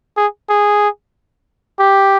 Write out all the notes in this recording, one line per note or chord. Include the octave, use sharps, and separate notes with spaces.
G#4
G#4
G4